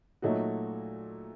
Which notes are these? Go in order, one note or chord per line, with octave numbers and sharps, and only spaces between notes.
A#2 F#3 A3 D#4 F#4